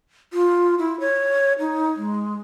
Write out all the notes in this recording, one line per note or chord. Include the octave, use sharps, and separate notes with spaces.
F4
E4
C#5
D#4
G#3